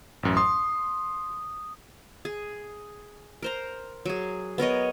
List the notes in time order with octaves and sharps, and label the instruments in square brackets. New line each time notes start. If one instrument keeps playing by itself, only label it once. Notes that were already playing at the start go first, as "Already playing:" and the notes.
[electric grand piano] A1 F#2
[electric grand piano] C6 [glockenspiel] D#6
[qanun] G#4
A#4 C5 A#5
F#3 G#4
B3 A#4 C#5 D#5